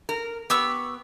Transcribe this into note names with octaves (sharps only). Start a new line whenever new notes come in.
A#4
B3 G4 C#6 E6